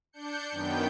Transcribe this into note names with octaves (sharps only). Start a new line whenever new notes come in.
D4 G6 C#7
F#2 D#3 B3 G5 G6